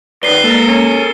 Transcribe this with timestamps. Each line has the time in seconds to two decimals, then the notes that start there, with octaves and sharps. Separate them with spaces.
0.23 F#2 D#3 B4 D5 C7 G7
0.44 G#3 A#3 A4 A#4
0.68 C#4